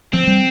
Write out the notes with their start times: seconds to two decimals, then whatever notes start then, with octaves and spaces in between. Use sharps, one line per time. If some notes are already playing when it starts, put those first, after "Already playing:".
0.13 F3 C4
0.27 G3